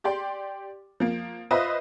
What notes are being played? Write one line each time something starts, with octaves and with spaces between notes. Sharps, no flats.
G4 D5 G5 C6
F3 A#3
F4 B4 C5 D#5 E5